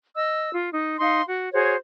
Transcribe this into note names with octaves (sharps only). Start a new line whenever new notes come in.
D#5 E6
F4
D#4
D#4 F5 C6
F#4
F#4 G#4 C5 C#5